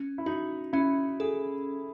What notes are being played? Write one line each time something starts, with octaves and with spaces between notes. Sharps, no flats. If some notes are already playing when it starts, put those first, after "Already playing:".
Already playing: C#4
E4
D#4 F#4
C#4 E4
G#4 A4